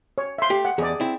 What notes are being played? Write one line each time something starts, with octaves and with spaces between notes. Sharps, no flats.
C#5
E5 C6
A3 G4
F#5
E2 G#4 D5
C4 E4